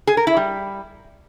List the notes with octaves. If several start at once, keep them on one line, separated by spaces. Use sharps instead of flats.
G#4
A#4
E4
G3